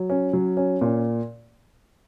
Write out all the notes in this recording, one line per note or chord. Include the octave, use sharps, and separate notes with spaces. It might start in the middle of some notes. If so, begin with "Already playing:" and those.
Already playing: F#3
C#4
F#3
C#4
A#2